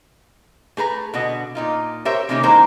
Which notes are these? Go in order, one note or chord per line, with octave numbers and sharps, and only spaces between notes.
A3 G#4 B4 A#5
B2 D3 F#4 D#5
A#2 D#4 F4
G4 A#4 C5 C#5 E5
C3 D#3 G3 A#3 C#4 G4
E3 G#3 A#3 D#4 C5 A#5